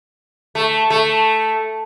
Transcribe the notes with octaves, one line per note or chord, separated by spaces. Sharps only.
A3
A3